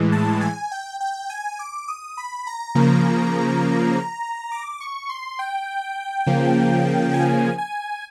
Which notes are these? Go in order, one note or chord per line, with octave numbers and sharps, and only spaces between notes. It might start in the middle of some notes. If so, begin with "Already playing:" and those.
Already playing: A2 E3 G#3
A5
G#5
G5
G5
G#5
D6
D#6
B5
A#5
C#3 F3 A#3
D6
C#6
C6
G5
C#3 F3 A#3
G#5
G#5